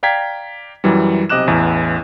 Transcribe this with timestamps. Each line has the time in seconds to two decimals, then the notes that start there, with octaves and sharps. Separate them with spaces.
0.03 D5 F5 G5 A#5 G#6 B6
0.84 F#2 E3 F#3 G3
1.29 B1 C3 D#5 D6 F#6 E7
1.47 A1 E2 E4